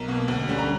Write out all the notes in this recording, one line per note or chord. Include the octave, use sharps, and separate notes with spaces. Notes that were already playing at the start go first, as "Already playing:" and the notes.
Already playing: B1 A#4
B2 A#3
D2
D3 G3 C#4
A#5